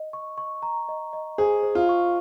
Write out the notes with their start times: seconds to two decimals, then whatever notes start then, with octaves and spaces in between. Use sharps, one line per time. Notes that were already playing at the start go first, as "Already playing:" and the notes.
Already playing: D#5
0.13 C#6
0.38 C#6
0.63 A#5
0.89 D#5
1.13 D#5
1.38 G#4 C5
1.63 C5
1.75 F4
1.89 C#6